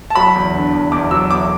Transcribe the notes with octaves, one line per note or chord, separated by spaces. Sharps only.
A5
F#3 B5
E2
D3
E2
E2 D6
F#3 E6
E2 D6